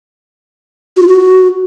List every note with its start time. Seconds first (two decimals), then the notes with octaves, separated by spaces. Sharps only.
0.97 F#4
1.02 F4
1.08 F#4